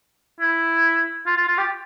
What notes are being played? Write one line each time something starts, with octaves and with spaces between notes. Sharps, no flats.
E4
F4
F4
F4
G4